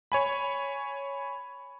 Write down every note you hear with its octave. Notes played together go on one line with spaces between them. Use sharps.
C#5 G#5 B5